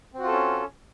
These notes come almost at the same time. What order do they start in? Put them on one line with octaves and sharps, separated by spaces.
C4 F#4 F4 A4 C#4